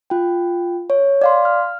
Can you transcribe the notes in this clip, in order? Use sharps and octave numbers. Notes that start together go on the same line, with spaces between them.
F4 G5
C#5
D5 F5 C6
F6